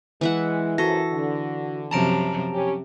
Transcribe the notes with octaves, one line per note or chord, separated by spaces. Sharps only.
E3 G#3 E5 F#5
F#2 F3 F#4 A4 A#6
D3
F#2 C3 F3 A5 A#5 D7
C3 C#4 G4